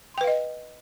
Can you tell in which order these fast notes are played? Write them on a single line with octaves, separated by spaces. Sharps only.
C6 G5 B4 F5 D#5